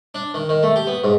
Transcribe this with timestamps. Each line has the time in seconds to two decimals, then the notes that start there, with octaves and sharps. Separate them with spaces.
0.15 D4
0.34 D#3
0.49 D#3
0.63 A3
0.76 G4
0.87 B3
1.04 G#2